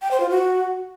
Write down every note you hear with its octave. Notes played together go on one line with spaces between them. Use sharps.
G5
C5
F4
F#4